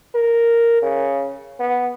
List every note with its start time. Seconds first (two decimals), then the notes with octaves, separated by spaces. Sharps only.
0.15 A#4
0.83 C#3
1.60 B3